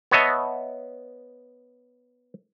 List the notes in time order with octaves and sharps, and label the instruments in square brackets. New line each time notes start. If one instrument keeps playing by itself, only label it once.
[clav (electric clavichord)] B3 C#5 D#5 E5 A5